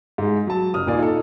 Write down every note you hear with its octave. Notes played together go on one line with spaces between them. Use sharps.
G#2 G#3
F#3 A5
F#1 D#6 F6
D#2 A#2 A#3 F4 D5 G#5
D#4 F4 A4